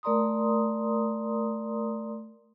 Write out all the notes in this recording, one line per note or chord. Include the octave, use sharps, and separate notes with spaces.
A3 A#4 D5 A#5 C6 D#6